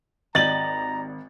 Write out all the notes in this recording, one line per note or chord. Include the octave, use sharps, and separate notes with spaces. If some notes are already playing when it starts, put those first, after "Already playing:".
G#1 G4 D5 D#5 A#5 A6 F#7